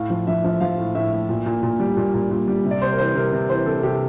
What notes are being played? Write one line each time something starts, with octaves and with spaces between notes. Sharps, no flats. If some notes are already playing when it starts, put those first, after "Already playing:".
Already playing: A2 F5
F3
F3 E5
F3 E5
F3 F5
A2
A2 E5
A2
A#2
A#2
A#2
G3
A#2
A#2
A#2
G3
C3
D5
C3 C5
A#4
E3 C5
C3 A#4
C3
E3 C5
C3 A4
C3 G4